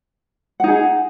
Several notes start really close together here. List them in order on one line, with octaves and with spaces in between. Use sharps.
F#5 D#4 G#4